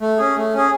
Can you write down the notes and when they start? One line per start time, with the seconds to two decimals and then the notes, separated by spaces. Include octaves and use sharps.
0.01 A3
0.18 C#4 G#4
0.36 A3
0.54 C#4 G#4